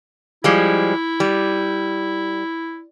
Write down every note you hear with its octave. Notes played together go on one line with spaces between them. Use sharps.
F3 G3 G#3 E4
G3